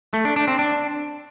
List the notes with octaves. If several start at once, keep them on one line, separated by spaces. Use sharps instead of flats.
A3
D4
D4
C4
D4